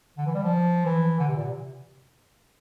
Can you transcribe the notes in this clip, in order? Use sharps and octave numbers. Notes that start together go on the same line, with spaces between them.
D3
E3
G3
F3
E3
D3
C3
A#2
C3